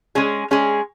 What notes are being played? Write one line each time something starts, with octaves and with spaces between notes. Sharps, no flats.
G#3 C#4 G#4
G#3 C#4 G#4